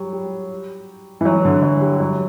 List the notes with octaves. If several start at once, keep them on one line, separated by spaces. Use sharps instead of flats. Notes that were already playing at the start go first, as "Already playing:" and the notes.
Already playing: F#3 G3
G3
E3
F#3
D3
F#3
G3
F#3